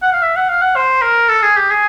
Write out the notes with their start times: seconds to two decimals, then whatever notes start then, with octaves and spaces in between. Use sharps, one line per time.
0.02 F#5
0.13 F5
0.22 E5
0.36 F#5
0.49 F5
0.61 F#5
0.76 C5
1.02 A#4
1.29 A4
1.42 G#4
1.56 G4
1.70 G#4